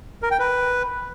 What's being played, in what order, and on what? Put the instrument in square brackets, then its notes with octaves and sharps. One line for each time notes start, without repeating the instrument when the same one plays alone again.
[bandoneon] A#4
G5
B4